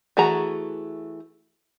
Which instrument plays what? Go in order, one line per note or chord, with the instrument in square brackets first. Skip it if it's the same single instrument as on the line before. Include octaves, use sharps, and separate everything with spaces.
[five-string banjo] E3 A3 F#4 G#4 A#5